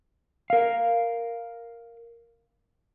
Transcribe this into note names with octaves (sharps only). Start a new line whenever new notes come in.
A#4 F5